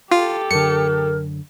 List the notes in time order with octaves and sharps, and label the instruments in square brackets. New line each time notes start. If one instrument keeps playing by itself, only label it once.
[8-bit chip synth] F4 [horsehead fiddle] G4 A4
[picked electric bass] F#2 D3 [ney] A#4 [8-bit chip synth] C#7